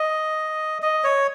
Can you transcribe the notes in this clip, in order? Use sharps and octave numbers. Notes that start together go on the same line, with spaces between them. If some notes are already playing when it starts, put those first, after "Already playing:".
Already playing: D#5
D#5
C#5